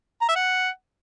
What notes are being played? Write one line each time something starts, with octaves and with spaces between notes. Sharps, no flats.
A#5
E5
F#5